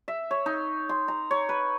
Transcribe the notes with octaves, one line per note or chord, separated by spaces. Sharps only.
E5
C#5
D#4
C6
A#5
C#5
B4